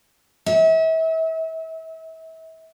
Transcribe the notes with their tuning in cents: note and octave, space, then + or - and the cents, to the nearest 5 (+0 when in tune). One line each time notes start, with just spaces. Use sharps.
E5 -35